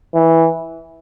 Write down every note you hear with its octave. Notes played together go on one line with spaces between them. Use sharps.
E3